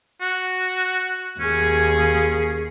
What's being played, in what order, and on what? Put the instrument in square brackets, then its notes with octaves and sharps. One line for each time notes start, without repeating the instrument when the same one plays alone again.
[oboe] F#4
[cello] D#2 G#4 [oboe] C#4